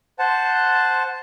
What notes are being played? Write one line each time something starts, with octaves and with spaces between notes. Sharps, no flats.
C5 F#5 A5